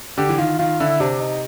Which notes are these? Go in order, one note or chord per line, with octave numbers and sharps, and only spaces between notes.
D3 G4
E3
D#3 F4
D#3 F4
D3 E4
C3 D4
D#4